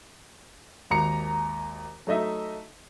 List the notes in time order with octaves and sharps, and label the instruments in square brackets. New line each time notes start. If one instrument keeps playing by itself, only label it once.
[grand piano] G#1 D#2 A#5 C#7
F#3 A3 D#4 D#5 E5